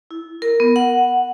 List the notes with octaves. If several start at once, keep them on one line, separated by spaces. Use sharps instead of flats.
E4
A#4
B3
F#5